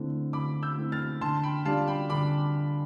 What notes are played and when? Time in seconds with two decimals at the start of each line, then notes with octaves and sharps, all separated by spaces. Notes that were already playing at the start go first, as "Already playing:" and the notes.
Already playing: D3 A3 C4 E4
0.33 D3 B5 D6
0.63 E6 G6
0.77 A3 C4 E4
0.92 F6 A6
1.21 D3 A5 C6
1.43 G5 B5
1.65 G3 D4 F4 F5 A5
1.88 G5 B5
2.10 D3 B5 D6